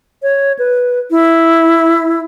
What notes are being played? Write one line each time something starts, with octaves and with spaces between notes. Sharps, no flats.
C#5
B4
E4